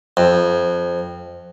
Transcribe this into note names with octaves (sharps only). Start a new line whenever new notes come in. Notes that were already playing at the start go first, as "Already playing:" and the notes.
F2